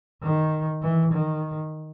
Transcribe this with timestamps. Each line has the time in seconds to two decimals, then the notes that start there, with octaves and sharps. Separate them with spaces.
0.22 D#3
0.82 E3
1.13 D#3